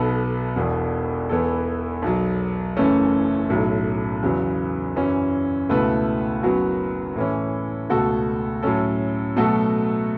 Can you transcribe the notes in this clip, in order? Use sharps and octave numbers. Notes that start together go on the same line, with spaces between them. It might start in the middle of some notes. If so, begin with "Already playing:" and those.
Already playing: B1 B2 B3 A4
E1 E2 B2
E2 E3 B3 A4
B1 B2 F#3
F#1 F#2 E3 A3 C#4
B1 A2 F#3
E2 C#3 F#3 B3
F#2 E3 C#4 F#4
C#2 B2 A3 E4 B4
F#1 F#2 F#3 B3 F#4
A2 E3 C#4
C#2 B2 A3 F#4 A4
A2 F#3 C#4 A4
B2 F#3 A3 F#4 A4